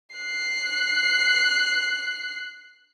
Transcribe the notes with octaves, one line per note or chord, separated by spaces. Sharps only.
F#6 C7